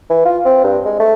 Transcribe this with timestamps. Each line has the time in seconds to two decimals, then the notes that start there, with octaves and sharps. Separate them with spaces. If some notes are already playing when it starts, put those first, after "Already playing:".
0.10 E3
0.25 F4
0.45 C4
0.64 G2
0.85 G#3
0.99 A3